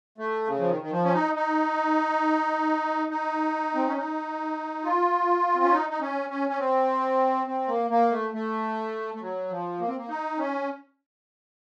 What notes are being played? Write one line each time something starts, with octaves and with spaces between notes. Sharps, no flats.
A3
C#3
F3
D#3
D#3
F3
C#4
D#4
D#4
D#4
C4
C#4
D#4
F4
C4
C#4
D#4
D#4
C#4
C#4
C#4
C4
C4
A#3
A#3
A3
A3
A3
F#3
F3
A#3
C4
A#3
D#4
C#4